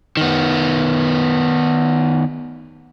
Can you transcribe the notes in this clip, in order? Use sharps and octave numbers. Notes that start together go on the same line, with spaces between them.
D#3 B3